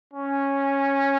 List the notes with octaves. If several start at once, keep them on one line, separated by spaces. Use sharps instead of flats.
C#4